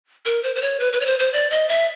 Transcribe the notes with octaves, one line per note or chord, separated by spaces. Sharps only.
A#4
C5
C5
C#5
B4
B4
C#5
C5
C5
D5
D#5
E5